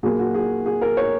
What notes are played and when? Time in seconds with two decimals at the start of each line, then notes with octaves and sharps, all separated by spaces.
0.03 A#2 F#3 A#3 G#4
0.19 F#4
0.34 G#4
0.66 G#4
0.81 A#4
0.97 C#5